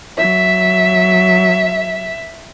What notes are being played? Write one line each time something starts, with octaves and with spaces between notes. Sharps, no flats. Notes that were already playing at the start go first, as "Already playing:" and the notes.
F#3 E5